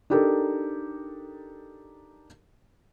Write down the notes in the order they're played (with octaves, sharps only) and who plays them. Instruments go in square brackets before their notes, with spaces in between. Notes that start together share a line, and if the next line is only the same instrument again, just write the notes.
[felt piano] D4 D#4 G4 A4 A#4